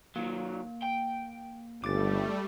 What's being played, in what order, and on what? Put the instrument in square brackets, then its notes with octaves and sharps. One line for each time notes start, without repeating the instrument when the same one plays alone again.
[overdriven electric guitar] D#3 F#3 [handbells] A#3
[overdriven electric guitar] G5
[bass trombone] G1 [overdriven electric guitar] C#2 [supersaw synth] G3 A3 [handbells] D6 A6